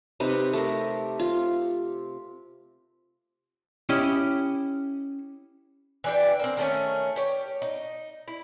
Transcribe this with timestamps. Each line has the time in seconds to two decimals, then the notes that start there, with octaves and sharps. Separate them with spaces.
0.20 C3 D#4 B4
0.53 A3 A#4
1.20 F4
3.89 C#4 E4 G4 D#5
6.04 E3 D4 G5
6.40 A#3 C4
6.57 D#3 A3 C#4
7.16 G4 C#5
7.62 D#4
8.28 E4